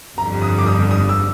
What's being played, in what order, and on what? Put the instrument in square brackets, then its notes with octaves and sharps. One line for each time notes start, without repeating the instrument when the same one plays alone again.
[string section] G1 F2 D3 G3 [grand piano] A#5
[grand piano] D#6
D6
D#6
D#6
E6